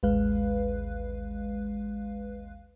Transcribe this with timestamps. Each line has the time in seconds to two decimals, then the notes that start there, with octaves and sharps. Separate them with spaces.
0.03 A1 D#2 G#3 B4 F5 F#6